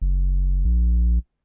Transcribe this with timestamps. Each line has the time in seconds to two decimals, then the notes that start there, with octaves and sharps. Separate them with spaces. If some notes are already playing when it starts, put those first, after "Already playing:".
0.02 F#1
0.65 A#1